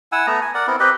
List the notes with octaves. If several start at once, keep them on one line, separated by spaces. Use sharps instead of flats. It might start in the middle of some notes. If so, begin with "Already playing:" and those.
E4 F#5 G#5 E6
A3 B3 A#5
G#5
A#4 D5 F#5
B3 C4 E4 A#4
C4 G4 B4 D#5